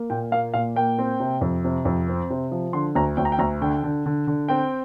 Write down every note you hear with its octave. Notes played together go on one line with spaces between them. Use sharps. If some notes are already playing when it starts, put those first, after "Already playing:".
Already playing: A#3
A#2 G5
A#3 F5
A#2 F5
A#3 G5
C4
C3
F2
C3
F2
C4
C3
F3
D3 C6
D2 A#5
D2 G5
A#5
G5
D2 A#5
D3 G5
D3
D3
D3
C4 G5